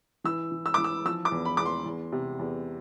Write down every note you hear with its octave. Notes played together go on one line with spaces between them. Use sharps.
E3 E6
E3
E6
E3 D6
E6
F3 E6
D6
E2
B5
E2 D6
C6
E2
C3
E2